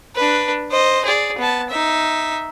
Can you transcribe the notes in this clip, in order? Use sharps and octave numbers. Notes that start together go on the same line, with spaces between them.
D4 B4
C5 D#5
G#4 D5
B3 A5
D#4 E5